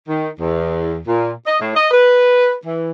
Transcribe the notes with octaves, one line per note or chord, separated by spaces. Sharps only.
D#3
E2
A#2
D#5
A2
D#5
B4
E3